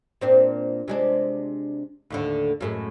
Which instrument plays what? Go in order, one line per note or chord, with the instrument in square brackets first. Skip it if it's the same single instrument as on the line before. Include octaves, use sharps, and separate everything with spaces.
[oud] A#2 C4 D4
C3 G#3 D4
D#2 A2 D3
F#2 A2 G#3